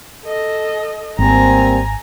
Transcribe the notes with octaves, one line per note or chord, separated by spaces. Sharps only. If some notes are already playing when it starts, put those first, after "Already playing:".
A4 D#5
G#1 G3 A#3 C4 G#5 A#5